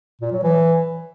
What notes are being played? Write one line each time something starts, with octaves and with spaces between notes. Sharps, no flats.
A#2
F#3
E3